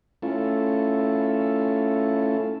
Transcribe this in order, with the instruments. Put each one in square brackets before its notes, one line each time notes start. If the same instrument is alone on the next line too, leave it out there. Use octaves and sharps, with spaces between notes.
[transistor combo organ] A3 C#4 E4 F4 A4